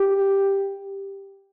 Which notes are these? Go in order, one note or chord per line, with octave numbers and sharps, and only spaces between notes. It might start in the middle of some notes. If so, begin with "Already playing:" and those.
Already playing: G4